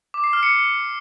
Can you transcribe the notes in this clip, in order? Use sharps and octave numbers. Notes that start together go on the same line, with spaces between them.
D6
C7
F6
C#7